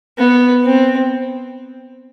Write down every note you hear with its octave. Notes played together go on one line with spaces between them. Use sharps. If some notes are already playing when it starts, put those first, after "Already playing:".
B3
C4